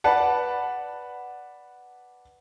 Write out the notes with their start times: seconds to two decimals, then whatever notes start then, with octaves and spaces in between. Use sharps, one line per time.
0.04 B4 D5 F#5 A5